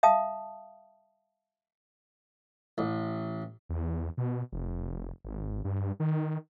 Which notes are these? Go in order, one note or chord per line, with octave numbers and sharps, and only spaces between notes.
E5 F5 A5 D#6
A1
E2
B2
F1
G#1
G2
D#3